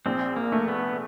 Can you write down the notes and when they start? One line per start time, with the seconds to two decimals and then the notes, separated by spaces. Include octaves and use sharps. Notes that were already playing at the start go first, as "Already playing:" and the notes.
0.06 A#1 C4
0.36 A#3
0.52 A3
0.68 B3